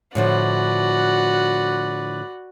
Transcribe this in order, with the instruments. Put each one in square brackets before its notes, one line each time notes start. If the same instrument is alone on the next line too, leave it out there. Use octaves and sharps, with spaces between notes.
[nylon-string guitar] A2 D3 F3 [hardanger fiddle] F#4 [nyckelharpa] B4 D5